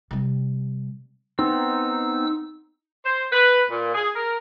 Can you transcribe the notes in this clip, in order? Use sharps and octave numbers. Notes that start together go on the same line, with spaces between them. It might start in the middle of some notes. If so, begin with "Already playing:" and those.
C3 G3
B3 C4 D#4 E6
C5
B4
A#2
G#4
A#4